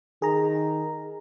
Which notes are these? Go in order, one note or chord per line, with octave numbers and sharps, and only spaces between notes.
D#3 G#4 A#5